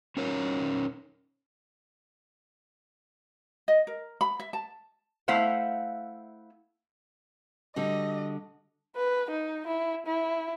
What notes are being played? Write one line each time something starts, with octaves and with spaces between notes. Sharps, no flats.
C#4 D#4 A#4 C#5
D#5
A#4
B5
E5
A5
A3 E4 C5 F5 F#5
D3 G3 F#4 D#5
B4
D#4
E4
E4